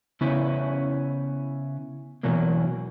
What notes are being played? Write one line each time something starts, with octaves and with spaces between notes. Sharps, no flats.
C#3 B3 C#4 E4
B2 E3 F#3 A#3